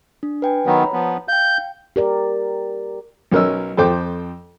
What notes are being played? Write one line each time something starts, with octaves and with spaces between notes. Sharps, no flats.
D4
B4 G5 G#5
D#3 F#3 B3 C#5 A#5 B5
F3 B3
F5 G5 G6
G4 A#4 D5
B1 C#4 A#4 D#5 E6
F2 A4 C5 G5 D6